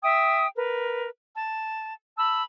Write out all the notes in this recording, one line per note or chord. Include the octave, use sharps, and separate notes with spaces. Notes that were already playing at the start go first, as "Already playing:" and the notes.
E5 G5 D#6
A#4 B4
A5
A5 B5 E6